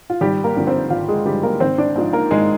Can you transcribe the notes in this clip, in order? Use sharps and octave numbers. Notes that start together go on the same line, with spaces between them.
F4
G#1 G3 G4
A#3 A#4
G2 D3 F3
C4 C5
G#1 F4 F5
G#3 G#4
G2 D3 F3 G3 G4
A#3 A#4
G#1 C4 C5
D4 D5
G#2 F3
A#3 A#4
G#1 G#3 G#4